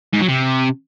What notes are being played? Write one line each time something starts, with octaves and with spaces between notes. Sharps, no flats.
G#2
F#3
C3